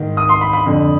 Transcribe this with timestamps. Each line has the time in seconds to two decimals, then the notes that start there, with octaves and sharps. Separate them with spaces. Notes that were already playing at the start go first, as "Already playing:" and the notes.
Already playing: G#2 D#3
0.17 D#6
0.29 C6
0.41 B5
0.53 B5
0.65 F2 D3